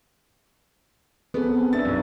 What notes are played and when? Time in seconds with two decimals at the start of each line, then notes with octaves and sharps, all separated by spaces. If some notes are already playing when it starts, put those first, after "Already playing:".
1.34 B3 C4 G#4 A4
1.73 D4 E5 A6
1.85 B1 F#2